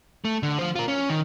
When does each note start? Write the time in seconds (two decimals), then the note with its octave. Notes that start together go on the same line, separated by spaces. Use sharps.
0.25 A3
0.43 D3
0.59 F3 C5
0.76 F4 A#4
0.88 C#4
1.10 D#3